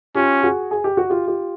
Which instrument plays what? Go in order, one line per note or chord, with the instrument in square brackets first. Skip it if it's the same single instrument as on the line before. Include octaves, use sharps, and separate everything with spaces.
[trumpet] C#4 [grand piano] F4 G4
[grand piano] F#4 G#4
G#4
G4
F#4
F4 G4
F4 G4